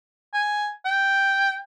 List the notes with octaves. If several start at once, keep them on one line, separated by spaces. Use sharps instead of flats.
G#5
G5